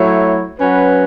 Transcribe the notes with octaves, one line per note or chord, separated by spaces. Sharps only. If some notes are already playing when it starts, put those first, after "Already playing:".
Already playing: F#3 A3 E4 C#5
F#3 C#4 F#4 B4